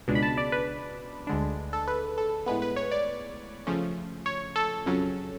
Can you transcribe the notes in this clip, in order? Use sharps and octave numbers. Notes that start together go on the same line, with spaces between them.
C#2 B2 G#3 D4
B5
A5
D5
B4
D2 D3 G#3 D4
A4
B4
A4
A2 G#3 B3 B4
B4
C#5
D5
C#3 F3 A3 C#4
C#5
A4
F2 C#3 F#3 C#4